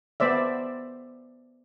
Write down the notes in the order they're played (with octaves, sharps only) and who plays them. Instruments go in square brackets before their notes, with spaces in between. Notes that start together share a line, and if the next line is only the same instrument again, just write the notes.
[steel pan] B3 C5 D5 E5